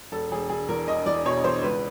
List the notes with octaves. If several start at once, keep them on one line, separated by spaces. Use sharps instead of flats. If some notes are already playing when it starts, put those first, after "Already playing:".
E1 A4
E1 G#4
E1 G#4
E2 A#4
E1 D#5
E2 D5
B2 C#5
E2 C5
C#2 B4